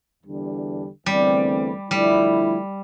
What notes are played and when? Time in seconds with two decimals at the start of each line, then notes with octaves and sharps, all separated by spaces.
0.22 E2 D3 G3 D4
1.06 E2 D3 G3 A3 C4
1.90 D3 F3 G3 A3 E4